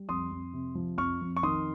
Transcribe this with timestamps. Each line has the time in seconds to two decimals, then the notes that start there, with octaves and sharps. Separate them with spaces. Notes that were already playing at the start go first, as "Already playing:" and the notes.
Already playing: G3
0.09 F2 C6 D#6
0.31 F2
0.53 C3
0.75 F3
0.98 F2 C#6 F6
1.21 F2
1.37 C#6
1.43 D#3 C6 D#6